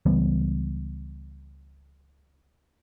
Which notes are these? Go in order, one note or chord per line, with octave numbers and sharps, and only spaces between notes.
C#2 E3 G3 B3